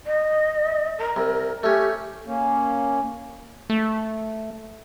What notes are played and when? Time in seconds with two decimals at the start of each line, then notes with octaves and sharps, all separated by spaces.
0.06 D#5
0.98 A#4
1.16 C2
1.63 A3 C#4 G4
2.26 A#3 C#4
3.70 A3